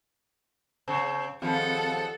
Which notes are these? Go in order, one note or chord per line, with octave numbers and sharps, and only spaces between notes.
C#3 C4 A#5 C#6
D#2 F3 G#3 C4 A4 F5 F#5 B5